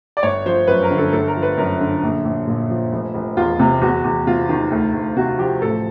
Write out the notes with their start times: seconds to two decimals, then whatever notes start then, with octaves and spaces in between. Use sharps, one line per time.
0.17 D5
0.23 G1 C#5
0.46 F3 C5
0.67 F#2 B4
0.83 A#4
0.91 D3
0.98 A4
1.12 G1 A4
1.28 A#4
1.36 F3
1.43 B4
1.58 F#2 A#4
1.80 D3
2.03 A#1
2.25 A#1
2.47 A#2
2.70 F3
2.93 F1
3.15 F1
3.37 E2 F4
3.60 C3
3.81 E2 F#4
4.04 E2
4.27 C3 F4
4.49 D#3
4.72 D2
4.94 D2
5.16 C3 F#4
5.38 F3 G4
5.61 A1 A4